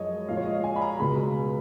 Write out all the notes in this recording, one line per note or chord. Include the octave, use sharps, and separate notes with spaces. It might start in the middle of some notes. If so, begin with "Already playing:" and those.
Already playing: F#2 F3 G#3 C#5 D#5
A#2 F3 G#3 F5
C#5
D#5
F5
G#5
B5
A#5
C#2 B2 G#3 B5